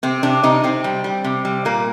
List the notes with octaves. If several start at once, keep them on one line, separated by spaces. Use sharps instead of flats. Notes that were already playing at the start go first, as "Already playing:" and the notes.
C3 C4
C3 D4
C3 D#4
C3 C4
G3
G3
C3
G3
A#2 A#3